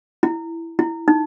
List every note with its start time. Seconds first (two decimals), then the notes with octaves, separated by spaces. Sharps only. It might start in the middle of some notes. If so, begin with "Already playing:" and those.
0.23 E4
0.79 E4
1.08 D#4